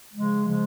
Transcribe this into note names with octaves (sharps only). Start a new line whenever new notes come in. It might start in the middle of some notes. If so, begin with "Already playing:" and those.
C#3 F3 G#3
C#3 F3 G#3